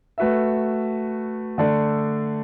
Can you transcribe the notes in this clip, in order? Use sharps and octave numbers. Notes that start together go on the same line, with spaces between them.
A3 F#4 B4 E5
D3 A3 D4 A4 D5